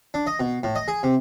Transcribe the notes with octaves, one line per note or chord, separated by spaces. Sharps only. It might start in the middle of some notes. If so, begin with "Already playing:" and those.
D4
D#5
B2
A2
D#5
G#4
C3